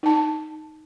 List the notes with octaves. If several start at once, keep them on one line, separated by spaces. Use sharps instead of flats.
D#4 A5